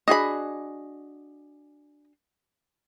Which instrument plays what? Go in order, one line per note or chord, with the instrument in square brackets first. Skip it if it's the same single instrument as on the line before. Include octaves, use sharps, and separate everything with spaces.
[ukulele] D4 F#4 G#4 [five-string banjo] D#5 B5